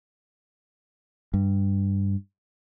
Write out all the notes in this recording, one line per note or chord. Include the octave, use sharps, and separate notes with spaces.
G2